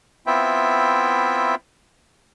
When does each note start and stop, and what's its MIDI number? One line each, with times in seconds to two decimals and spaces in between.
0.27 1.55 59
0.27 1.55 60
0.27 1.55 64
0.27 1.55 65
0.27 1.55 76
0.27 1.55 79